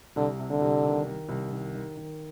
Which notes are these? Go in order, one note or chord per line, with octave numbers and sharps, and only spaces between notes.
C2 D3
C3
D3
C2
D#3
D#3
C2
D#3
D#3
D#3